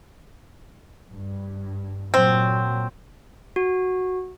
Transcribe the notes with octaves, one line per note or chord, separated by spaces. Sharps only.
G2
A#2 F#3 C4
F#4